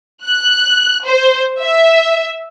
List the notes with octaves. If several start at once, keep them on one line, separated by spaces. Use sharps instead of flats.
F#6
C5
E5